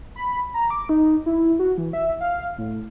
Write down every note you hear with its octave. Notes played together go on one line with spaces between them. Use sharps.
B5
A#5
D6
D#4
E4
F#4
E3
E5
F5
A2